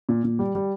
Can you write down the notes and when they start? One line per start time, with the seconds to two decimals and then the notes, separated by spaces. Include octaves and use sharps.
0.09 A#2
0.24 A#2
0.39 G3
0.55 G3